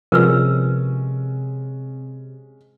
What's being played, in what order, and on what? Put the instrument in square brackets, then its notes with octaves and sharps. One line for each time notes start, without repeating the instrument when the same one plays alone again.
[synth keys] C3 [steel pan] F3 [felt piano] G#3 C#4 [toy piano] A#4 B4 E6